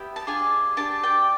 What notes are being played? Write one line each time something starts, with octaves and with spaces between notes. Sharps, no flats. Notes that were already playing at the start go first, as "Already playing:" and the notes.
Already playing: B3 E4 G4
A5
D4 F4 G#4 G#5
D4 G4 A5
G5